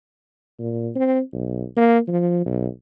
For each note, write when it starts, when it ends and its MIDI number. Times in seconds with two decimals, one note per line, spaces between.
0.59 0.90 46
0.95 1.20 60
1.33 1.65 35
1.77 1.99 58
2.08 2.41 53
2.46 2.67 35